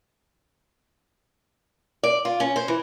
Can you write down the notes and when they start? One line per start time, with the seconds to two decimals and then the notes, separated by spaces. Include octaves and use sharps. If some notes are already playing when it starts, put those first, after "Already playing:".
2.03 D5
2.25 F4
2.40 C#4
2.56 C5
2.68 E3